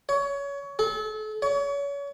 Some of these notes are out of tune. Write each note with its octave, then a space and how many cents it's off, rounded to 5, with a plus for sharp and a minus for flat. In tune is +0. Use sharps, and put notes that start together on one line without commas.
C#5 +25
A4 -35
C#5 +35